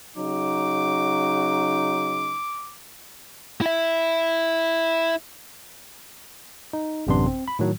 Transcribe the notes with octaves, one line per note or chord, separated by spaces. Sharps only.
C#3 F#3 D#4 D6
E4 E5
D#4
A1 F#2 C3 B3 D4 C6
C4
B5
A2 D#3 F#3